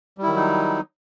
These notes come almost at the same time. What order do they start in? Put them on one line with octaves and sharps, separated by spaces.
G3 E4 D#3 F#3 D#4